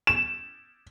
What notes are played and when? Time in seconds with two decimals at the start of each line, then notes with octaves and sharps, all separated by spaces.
0.07 E7